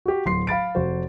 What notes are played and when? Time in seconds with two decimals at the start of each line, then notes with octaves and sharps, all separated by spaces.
0.06 F#4 G4
0.26 D1 C6 C7
0.47 F5 B5 A6 D7
0.75 F1 F#4 C5